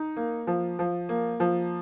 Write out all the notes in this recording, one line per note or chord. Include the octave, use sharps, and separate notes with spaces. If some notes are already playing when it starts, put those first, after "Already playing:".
Already playing: D#4
A#3
F3
F3
A#3
F3